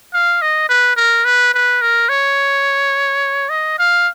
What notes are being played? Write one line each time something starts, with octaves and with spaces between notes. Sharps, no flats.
F5
D#5
B4
A#4
B4
B4
A#4
C#5
D#5
F5